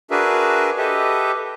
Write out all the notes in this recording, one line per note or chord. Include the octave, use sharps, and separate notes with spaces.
D4 F#4 G#4 A#4 B4 E5
G4 A4 B4 D#5 E5